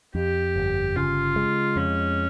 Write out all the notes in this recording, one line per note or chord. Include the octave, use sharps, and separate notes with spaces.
F2 G4
G1
C#3 F4
G#3
F2 C#4